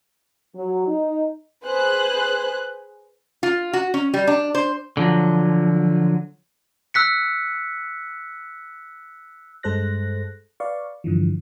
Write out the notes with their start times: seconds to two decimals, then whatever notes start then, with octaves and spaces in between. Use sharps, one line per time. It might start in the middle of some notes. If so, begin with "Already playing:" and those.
0.55 F#3
0.87 D#4
1.65 G#4 B4 C5 F#6
3.43 F4
3.73 F#4
3.94 C#4
4.14 G3
4.27 D4
4.55 C5
4.97 D3 F3 F#3
6.94 E6 F#6 B6 C#7
9.63 G2 G#3 A4 C5 F#6 A#6
10.60 B4 D5 F5 C#6
11.04 G2 D3 E3 F3